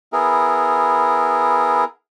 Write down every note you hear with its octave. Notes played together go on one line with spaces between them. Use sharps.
B3 E4 G#4 A#4